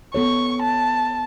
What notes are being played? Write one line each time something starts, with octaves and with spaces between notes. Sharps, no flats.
B3 A4 C#5 C#6
A5